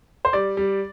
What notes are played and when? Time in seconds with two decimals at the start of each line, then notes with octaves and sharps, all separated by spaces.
0.25 C5
0.33 G3 D5
0.57 G3